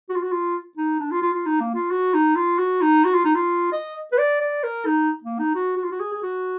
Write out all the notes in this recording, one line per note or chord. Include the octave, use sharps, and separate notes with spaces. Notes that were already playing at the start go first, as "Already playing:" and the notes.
F#4
F4
F#4
F4
D#4
D4
F4
F4
F4
D#4
A#3
F4
F#4
D#4
F4
F#4
D#4
F#4
F4
D#4
F4
D#5
B4
D5
D5
A#4
D#4
A#3
D#4
F#4
F#4
F4
F#4
G#4
G#4
F#4